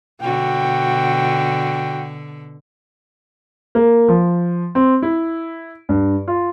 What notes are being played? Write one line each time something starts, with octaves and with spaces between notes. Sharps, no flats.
B2 D3 F#4 G5
A#3
F3
C4
E4
G2
F4